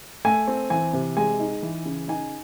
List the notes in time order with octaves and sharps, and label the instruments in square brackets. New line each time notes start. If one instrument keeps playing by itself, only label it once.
[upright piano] A3 G#5
C4
E3 G#5
C3
G#3 G#5
D#4
E3
C#3
D#4 G#5